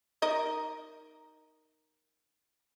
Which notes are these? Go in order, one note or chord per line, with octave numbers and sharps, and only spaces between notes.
D#4 A#4 D#5